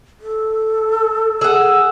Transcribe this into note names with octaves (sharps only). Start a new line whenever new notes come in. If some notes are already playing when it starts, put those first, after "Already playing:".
A4
G#4 F#5 E6